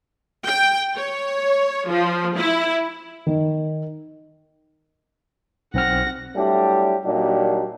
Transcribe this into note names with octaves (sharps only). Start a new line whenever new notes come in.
G5
C#5
F3
E4
D#3
B1 C4 F#5 F6 A#6
F#3 G3 A3 D4 E4 G4
A#2 F#3 G3 D4 D#4 G4